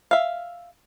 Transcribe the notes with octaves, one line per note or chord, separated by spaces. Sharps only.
E5 F5